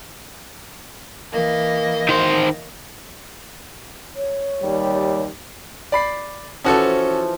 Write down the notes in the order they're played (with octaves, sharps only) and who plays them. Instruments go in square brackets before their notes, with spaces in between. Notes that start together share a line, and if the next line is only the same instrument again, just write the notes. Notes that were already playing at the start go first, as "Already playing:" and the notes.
[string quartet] E3 A#3 D#5
[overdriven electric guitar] D#3 C5
[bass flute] C#5
[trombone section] D#2 G3
[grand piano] D5 B5 C7
[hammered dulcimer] E3 F3 [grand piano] C#4 F#4 A4